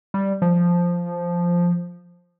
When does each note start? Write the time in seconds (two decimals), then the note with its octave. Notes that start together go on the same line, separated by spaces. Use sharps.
0.14 G3
0.42 F3